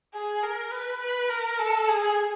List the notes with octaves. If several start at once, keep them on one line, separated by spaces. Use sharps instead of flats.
G#4
A#4
B4
B4
A#4
A4
G#4